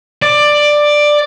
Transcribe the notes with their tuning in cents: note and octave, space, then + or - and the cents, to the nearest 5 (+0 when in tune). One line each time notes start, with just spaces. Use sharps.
D5 +10